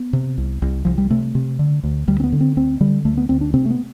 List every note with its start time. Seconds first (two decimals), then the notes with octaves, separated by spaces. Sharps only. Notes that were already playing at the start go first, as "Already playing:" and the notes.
Already playing: B3
0.13 C3
0.38 C2
0.62 C2
0.85 C2 F3
0.98 G3
1.10 C3 A3
1.35 C3
1.59 D3
1.83 D2
2.08 D2 G3
2.20 C4
2.24 B3
2.32 D3
2.41 C4
2.57 D2 C4
2.80 D3 G3
3.05 D2 A3
3.17 B3
3.29 D2 C4
3.41 D4
3.54 C3 C4
3.65 A3
3.70 B3